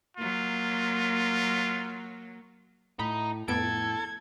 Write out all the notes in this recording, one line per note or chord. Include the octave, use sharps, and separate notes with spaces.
F#3 A#3 F4
A2 D#4 B5
F2 A2 B3 A4 G#6 D7